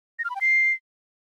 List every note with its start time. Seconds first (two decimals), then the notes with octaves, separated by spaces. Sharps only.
0.19 A#6
0.24 F6
0.30 B5
0.36 G5
0.41 C7